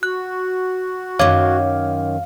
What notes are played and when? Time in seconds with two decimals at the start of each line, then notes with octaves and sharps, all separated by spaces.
0.03 F#4 F#6
1.19 F#2 D#3 C#5 F5 D6 G#6